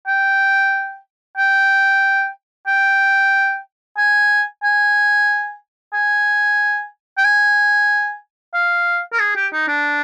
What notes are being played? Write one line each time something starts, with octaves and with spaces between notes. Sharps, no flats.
G5
G5
G5
G#5
G#5
G#5
G5
G#5
F5
A#4
G#4
G4
D#4
D4